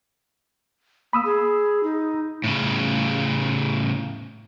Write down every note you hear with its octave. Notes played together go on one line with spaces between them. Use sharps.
A#3 B5 D#6 E6
G#4
D#4
A2 C#3